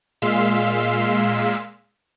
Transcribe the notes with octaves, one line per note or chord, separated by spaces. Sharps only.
A#2 G#3 F5 C6 E6 B6